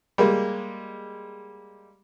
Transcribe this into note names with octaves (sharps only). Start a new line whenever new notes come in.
G3 G#3 A#3